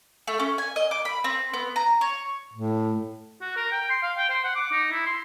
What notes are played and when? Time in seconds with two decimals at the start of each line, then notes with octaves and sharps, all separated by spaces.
0.28 A3
0.39 C#4
0.58 G#5
0.76 D#5
0.91 D6
1.05 B5
1.24 C4
1.53 B3
1.76 A#5
2.01 C#5
2.53 A2
3.41 F#4
3.56 A#4
3.72 G5
3.90 C6
4.03 F5
4.17 G5
4.29 C5
4.44 F#5
4.55 D6
4.72 D#4
4.91 E4
5.06 C6